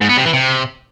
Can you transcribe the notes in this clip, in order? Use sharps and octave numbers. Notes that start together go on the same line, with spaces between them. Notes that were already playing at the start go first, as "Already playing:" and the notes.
G#2
B3
C3
E3
C3